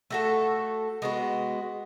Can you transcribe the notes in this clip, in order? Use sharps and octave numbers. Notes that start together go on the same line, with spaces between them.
A3 F#4 A4
G#3 B3 F#4